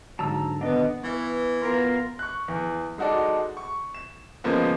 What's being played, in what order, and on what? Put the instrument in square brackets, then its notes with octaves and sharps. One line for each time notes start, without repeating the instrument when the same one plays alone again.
[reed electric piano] G#2 F#3 [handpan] D3 [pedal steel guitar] A5 A#5 E6
[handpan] D#3 F#5 [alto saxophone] B3 [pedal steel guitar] D4 D#5
[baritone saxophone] E3 [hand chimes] B3 B4
[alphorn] B3 [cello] F4 A#4 [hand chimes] C6
[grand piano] C#6 F#6
E2
G#3 D#4 F#4 A4 D5
C#6
E7
C#3 F3 G#3 A#3 B3